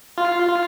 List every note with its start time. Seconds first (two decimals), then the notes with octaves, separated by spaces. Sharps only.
0.18 F4
0.48 F4